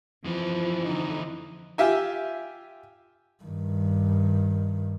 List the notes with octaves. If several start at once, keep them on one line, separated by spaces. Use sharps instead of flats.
F2 E3 F3
D3 D#4
F4 G4 E5 G#5
G2 D#3